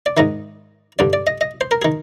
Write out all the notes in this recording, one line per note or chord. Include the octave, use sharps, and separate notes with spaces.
D5
G#2 D#3 D#5
G2 D3 D5
D5
D#5
D#5
C5
A#4
D#3 G#4